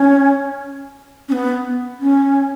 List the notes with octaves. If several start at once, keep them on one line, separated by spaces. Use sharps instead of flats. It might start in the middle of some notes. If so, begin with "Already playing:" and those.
Already playing: C#4
C#4
B3
C#4